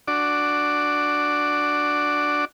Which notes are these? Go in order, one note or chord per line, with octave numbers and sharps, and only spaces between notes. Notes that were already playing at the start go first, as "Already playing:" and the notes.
D4 F#4 D5